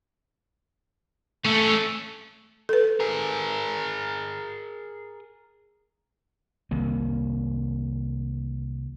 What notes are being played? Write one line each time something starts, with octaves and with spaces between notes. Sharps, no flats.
A3 C#4 A4
A4 B4
G#4 A#4
C2 D#3 A#3